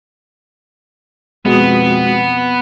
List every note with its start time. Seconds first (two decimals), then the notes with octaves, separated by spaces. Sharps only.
1.46 F2 B2 G#3 B3 F#4 D#6